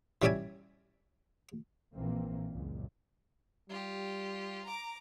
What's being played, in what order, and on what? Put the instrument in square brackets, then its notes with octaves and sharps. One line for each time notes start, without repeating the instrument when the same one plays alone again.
[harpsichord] E3 G3 C#4 D5 E5 G#5
[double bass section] A#1 A#2 E3 A#3 C4
C#2 F#2 A#2
[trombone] G3 [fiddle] F4 G4
[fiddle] A#5 D6